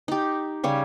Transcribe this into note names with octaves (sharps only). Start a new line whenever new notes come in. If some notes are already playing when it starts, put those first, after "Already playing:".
D#4 G4
C#3 G3 C#5